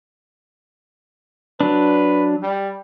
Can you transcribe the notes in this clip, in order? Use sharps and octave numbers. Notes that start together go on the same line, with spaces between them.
F#3 D4 B4
G3